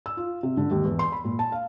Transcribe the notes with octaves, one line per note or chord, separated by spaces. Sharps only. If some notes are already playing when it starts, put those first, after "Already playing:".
E6
F4
C3
D3
D#2
E2
C6
B5
A#2
A5
F5